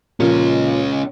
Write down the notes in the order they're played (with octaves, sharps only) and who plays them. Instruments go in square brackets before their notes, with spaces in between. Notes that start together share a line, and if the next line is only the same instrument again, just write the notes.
[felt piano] A#2 F3 [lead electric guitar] G#3 C#4